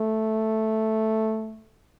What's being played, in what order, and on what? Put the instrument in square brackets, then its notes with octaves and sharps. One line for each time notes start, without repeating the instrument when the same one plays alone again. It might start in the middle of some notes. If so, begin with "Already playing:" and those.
Already playing: [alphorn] A3